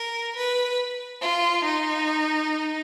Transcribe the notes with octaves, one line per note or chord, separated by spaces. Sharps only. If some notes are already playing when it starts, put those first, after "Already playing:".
Already playing: A#4
B4
F4
D#4